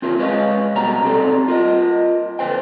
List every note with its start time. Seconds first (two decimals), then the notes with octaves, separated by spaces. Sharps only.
0.02 C4 F4 A#4 C#5
0.19 G#3 B4 C#5 D#5 F5
0.75 C2 B2 G3 F#4 A#4 A#5
1.04 C4 G4 A4 D5
1.48 F4 A#4 D#5
2.39 D3 B4 C5 G5